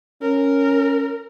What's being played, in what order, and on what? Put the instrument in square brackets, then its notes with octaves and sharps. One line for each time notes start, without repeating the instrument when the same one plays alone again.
[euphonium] C#4 [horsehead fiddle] A#4